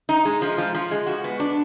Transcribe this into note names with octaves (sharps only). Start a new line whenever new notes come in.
D#4
G#3
F3
F3
F3
G#3
F#4
B3
D4